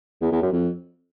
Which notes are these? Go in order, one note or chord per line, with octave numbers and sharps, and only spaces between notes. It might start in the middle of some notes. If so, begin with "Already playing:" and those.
E2
E2
F#2
F2